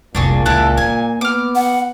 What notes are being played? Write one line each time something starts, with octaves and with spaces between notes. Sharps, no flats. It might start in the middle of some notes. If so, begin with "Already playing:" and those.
F1 C2 A#2 D4 F#4 G#4
C#2 E4 A4 F#6
A#3 G#5
B3 D6 F6
F#5